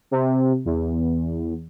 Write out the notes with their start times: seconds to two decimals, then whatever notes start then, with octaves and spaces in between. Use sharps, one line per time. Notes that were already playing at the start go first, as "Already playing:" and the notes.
0.11 C3
0.65 E2